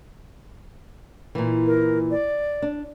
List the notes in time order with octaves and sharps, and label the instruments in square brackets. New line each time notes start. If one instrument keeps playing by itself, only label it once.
[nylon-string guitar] A#2 E3
[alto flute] A#4
D5
[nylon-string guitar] D4